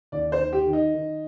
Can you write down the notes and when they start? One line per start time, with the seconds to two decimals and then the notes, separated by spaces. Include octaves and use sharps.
0.12 D#2 D5
0.32 C5
0.39 D#3
0.53 G4
0.67 D#3
0.73 D#4
0.94 D#3